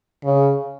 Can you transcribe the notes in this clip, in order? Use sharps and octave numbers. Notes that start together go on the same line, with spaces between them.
C#3